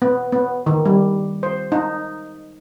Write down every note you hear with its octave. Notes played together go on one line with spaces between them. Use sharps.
B3
B3
D#3
G3
C5
D#4